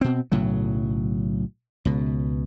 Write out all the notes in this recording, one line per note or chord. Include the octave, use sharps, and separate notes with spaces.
B2 C4
B1 A2 C#3 F#3
C#2 B2